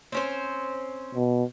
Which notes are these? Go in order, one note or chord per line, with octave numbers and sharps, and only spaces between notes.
C4 C#4 C5
B2